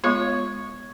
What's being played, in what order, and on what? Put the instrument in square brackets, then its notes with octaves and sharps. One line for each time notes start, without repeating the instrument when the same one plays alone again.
[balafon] G#3 B3 F4 [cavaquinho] C#5